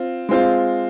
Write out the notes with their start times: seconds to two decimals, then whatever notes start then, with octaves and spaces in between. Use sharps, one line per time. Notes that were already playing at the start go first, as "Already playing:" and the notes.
Already playing: C4 F4
0.29 G#3 C4 F4